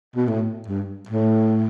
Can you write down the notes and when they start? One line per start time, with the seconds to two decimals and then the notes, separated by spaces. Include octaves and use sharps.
0.16 B2
0.28 A2
0.68 G2
1.09 A2